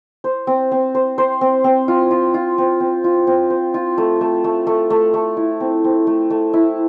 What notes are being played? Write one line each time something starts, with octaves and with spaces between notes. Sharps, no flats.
C5
C4
C4
C5
C5
C4
C4
F4
F4
F4
C4
C4
F4
C4
C5
F4
A3
A3
A3
A3
A3
A3
E4
C4
C4
A3
A3
E4